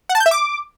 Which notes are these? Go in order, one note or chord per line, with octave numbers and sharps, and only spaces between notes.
F#5
A5
G6
E5
D6